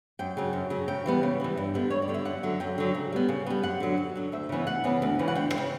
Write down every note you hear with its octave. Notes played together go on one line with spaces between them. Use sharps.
F#2 G5
C#3 F#3
F#2
C#3 F#3
C#3 G5
E3 G3 B3
C#3
E3 G3 B3
G2
D3 G3 B3
G2 C#5
D5
D3 G3 B3
E5
F#2 F#5
D3 F#3
F#2 G5
D3 F#3
C#3
G3 B3
C#3
G3 B3
F#2 F#5
D3 F#3
F#2
D3 F#3
D2 E5
C#3 E3 B3
D2 F#5
C#3 E3 B3
D2
C#3 E3
F#5
D2 G5
E3
C#3